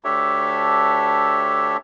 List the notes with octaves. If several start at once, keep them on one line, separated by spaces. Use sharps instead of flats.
D2 D4 G4 A4 C#5 E5